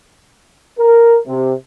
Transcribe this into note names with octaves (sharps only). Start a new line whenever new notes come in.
A#4
C3